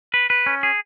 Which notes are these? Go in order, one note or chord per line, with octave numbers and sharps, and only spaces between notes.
B4
B4
C#4
G#4